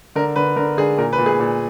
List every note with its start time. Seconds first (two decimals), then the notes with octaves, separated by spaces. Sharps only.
0.15 D3 A#4
0.36 D3 B4
0.56 D3 A#4
0.77 D3 G#4
0.98 A#2 A#4
1.13 B4
1.18 A#2
1.26 G#4
1.40 A#2